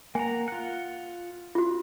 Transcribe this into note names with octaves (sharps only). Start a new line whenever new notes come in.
A#3 F#5 G#5 A#5
F4 F#5
F4 F#4